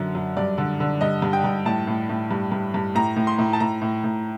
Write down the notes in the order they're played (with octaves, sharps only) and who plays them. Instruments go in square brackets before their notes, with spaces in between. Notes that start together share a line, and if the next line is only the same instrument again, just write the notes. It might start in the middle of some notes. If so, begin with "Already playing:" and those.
Already playing: [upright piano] F#2 D3
F#2
G2 D5
D3
D3
G2 D#5
G2
G5
G2
A2 A5
A2
A2
G2
G2
G2
A2 A#5
A2
C6
A2
A5
A2 A#5
A2
A2